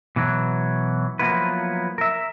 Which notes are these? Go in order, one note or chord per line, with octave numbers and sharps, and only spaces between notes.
B2 E3 F#3
F3 F#3 A#3 B3 E4 B4
A#4 E5